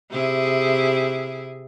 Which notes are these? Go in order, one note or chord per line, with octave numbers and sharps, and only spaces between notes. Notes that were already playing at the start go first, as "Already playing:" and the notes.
C3 E4 G#4